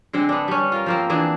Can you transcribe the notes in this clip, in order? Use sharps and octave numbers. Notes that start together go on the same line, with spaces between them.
D3 G#3 C4
B3 D4
G3 C#4
F4 A#4
F3 A#3 C4
E3 C4 D4 G#4